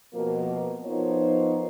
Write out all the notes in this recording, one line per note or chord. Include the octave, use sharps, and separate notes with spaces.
F2 B2 F3 A#3
F3 B3 D#4 A#4 C5 C#5